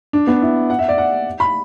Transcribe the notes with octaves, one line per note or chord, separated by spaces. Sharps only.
D4
B3
E4
F#5
E5
D5
F#5
B5